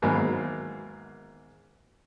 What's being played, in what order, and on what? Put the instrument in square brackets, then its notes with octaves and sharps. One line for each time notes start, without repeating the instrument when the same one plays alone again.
[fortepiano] E2 G#2 D#3 F#3 A#3 B5